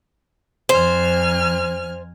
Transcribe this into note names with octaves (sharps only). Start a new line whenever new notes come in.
F2 C5 G#5 F6